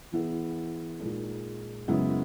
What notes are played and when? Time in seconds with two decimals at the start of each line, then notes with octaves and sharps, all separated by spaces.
0.12 E3 B3 E4 G#4
1.00 A#2 G#3 D#4 G#4
1.88 F#2 C#3 G#3 B3 E4